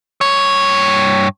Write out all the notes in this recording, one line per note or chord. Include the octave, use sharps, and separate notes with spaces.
G2 C#5